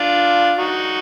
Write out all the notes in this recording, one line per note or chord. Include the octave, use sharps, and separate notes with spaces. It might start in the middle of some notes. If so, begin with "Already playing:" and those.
Already playing: D4 F4
D#4 F#4